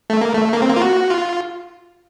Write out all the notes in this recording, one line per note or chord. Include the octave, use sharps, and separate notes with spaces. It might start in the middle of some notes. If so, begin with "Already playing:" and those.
A3
A#3
A3
A#3
C4
A#3
F4
F#4
F4